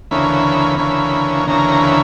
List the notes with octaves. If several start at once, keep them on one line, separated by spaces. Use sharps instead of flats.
D2 C#3 E3 A#3 C#4 B5
D2 C#3 E3 A#3 C#4
D2 C#3 E3 A#3 C#4 A#5
B5